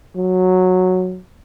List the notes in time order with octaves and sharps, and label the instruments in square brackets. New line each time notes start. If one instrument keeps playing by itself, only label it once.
[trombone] F#3